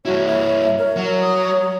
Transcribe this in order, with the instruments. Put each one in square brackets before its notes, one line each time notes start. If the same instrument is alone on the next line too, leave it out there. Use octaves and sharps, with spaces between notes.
[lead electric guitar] G2 E4 [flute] F#4 [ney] C#5
[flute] E5
[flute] A#4 [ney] C#5
[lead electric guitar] F#3
[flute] D#6